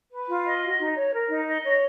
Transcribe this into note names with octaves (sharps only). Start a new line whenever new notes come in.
B4
F4
D#5
F#4
D#4
C#5
A#4
D#4
D#5
C#5